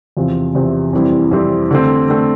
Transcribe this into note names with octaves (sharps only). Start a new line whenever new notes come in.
E2 C3 F3 C4
E2 C3 F3 C4
F2 E3 G3 C4 E4
F2 E3 G3 C4 E4
D3 A3 C4
D3 A3 C4